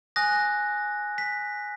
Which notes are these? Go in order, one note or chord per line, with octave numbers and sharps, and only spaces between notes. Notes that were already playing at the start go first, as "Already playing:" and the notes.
G#5 D#6 F#6 A#6
B6